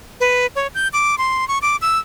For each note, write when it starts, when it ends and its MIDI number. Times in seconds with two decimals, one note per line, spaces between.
0.20 0.47 71
0.56 0.67 73
0.75 0.88 91
0.93 1.18 86
1.18 1.47 84
1.48 1.59 85
1.62 1.76 86
1.82 1.99 88